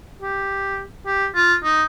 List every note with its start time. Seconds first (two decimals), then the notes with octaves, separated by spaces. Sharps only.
0.22 G4
1.06 G4
1.35 F4
1.64 D#4